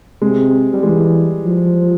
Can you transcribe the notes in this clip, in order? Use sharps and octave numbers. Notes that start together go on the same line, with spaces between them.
C3 G#3
G3
E3 G#3
F3